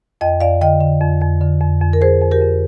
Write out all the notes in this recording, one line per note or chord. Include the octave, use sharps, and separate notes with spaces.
F2 D#5 G5
F2 D5 F5
D3 D#5 G5
D3
F2
F2
D3
F2
F2
A#4
F2 G#4 C5
F2
G4 A#4
F2